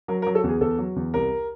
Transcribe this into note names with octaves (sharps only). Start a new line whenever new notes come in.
F#3 A#4
A#4
F#3
A4
E2 G#4
E2 A4
F#3
E2
C2 A#4